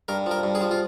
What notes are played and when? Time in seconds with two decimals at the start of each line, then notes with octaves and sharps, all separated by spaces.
0.08 G2 A#4
0.26 F3 A#4
0.43 G2
0.55 G#4
0.61 F3
0.71 F4